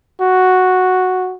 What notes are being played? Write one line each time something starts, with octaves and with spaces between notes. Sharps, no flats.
F#4